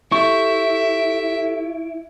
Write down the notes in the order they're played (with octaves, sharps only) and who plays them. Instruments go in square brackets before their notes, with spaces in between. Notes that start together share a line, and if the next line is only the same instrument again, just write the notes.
[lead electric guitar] E4 [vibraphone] G4 A4 [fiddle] E5 [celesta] C#6